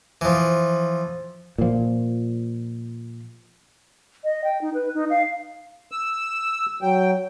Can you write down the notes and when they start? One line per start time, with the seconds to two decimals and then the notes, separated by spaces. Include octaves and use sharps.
0.21 E3 F3
1.58 A#2 F3
4.24 D#5
4.44 G5
4.61 D#4
4.74 B4
4.94 D#4
5.10 F5
5.92 E6
6.82 F#3 G5